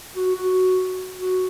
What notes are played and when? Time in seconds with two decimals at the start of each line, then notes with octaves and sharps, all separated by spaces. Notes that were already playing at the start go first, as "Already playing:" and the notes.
0.16 F#4
0.35 F#4
1.18 F#4